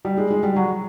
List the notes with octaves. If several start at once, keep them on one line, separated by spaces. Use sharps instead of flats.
G3
G#3
G#3
G3
F#3